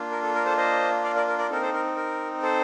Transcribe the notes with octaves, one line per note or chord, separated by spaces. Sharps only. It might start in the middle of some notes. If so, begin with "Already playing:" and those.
Already playing: A#3 D4 F4
A#4
A4
A#4
A4 C5
C5 D#5
D5 F5
A#4 D5
A#4
A#4 D5
C4 D#4 A4 A#4
A4 C5
A#4
A#4
A4 C5